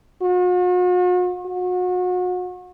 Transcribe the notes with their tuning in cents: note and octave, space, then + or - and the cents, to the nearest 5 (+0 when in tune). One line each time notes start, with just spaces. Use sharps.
F#4 -45
F#4 -35